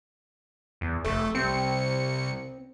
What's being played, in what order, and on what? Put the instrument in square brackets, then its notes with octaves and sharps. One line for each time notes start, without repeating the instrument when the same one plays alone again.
[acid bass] E2
[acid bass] F1 [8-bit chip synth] A3
[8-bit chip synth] C2 C#7 [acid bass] C4